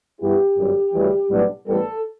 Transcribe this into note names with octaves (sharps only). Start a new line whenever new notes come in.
G2 E3 B3 E4 G4
G1 F#2 D3
D2 C#3 E3 G3
B1 A2 G3 B3 D4
A1 A2 G3 B3 A4